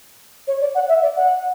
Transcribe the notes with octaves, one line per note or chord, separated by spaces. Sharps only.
C#5
D5
F#5
E5
D5
F#5